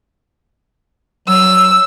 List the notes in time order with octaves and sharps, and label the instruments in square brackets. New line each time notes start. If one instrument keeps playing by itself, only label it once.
[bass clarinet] F#3 [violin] E6